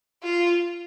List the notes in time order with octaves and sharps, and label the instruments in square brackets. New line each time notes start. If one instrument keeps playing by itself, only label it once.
[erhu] F4